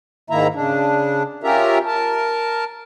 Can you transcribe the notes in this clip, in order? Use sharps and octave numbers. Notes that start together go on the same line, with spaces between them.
G#2 D#3 A#3 E4 E5 A#5
C#3 D4
C#4 F4 G4 A#4 E5 A#5
A#4 A5